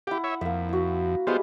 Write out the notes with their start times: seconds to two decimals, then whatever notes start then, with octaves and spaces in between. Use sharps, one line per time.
0.07 E4 G4 F#5
0.24 C#5 E5
0.41 F2 A#3 E5
0.69 E4 F#4
1.27 G3 G#3 B3 E4 F4 C5